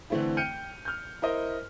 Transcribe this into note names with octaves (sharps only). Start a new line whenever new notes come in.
D3 E3 A3 C4 E4
G5 F6 G6 C#7 D#7
F6 G6
E4 A#4 C5 D#5